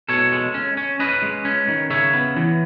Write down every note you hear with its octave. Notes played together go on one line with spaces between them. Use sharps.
B2 A4 C#5
G#3
C#4
C#4
C#4 B4 D#5
G#3
C#4
D#3
C#3 C#5 E5
B3
E3